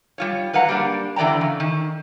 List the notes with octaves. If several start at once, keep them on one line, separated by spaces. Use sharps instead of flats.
G3 F4 C#5
F#3 B4 F5 F#5 A#5
G3 A#3 D4
D3 E3 D5 G5 A#5
C#3
D#3